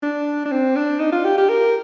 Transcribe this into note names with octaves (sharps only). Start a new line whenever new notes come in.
D4
D4
C4
D4
D#4
F4
G4
G4
A#4